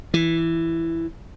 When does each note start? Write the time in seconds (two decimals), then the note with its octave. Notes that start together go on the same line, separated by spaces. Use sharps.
0.14 E3